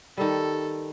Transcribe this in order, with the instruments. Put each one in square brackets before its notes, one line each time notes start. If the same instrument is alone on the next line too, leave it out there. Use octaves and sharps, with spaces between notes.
[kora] D#3 G3 [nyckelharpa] A4